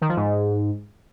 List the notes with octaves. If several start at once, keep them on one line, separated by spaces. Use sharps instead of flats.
D#3
F3
G#2